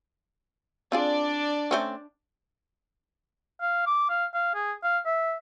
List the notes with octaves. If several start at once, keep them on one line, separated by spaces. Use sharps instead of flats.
C4 D4 F4 G#4 D5
A3 C4 C#4
F5
D6
F5
F5
G#4
F5
E5